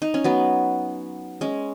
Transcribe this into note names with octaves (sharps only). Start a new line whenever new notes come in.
D#4
C#4
F#3 B3
G#3 C#4